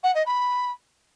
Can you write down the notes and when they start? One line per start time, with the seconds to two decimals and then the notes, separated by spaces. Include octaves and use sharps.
0.03 F#5
0.15 D#5
0.26 B5